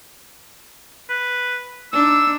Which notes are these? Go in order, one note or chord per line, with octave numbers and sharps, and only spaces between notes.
B4
D4 D#4 E6